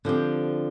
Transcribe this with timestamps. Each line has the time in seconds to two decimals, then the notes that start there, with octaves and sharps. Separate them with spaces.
0.05 D3 F3 C4 G4